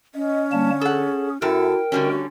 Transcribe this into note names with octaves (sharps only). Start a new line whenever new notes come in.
C#4 D#5
D3 G3 A#3 A5
G#4 A4 F#5
F#2 E4 F#4 A4 A#4 G5
D3 D#3 G3 A3 C#4 F#4